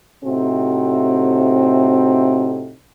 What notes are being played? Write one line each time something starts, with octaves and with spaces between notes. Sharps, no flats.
A2 C3 C4 D#4 F#4 A4